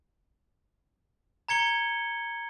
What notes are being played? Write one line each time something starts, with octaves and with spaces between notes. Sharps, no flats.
A#5 G#6 C#7 G7